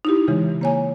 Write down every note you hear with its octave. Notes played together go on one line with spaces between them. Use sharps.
D#4 E4 G4
C#3 E3 G#3
A#3 C#5 G#5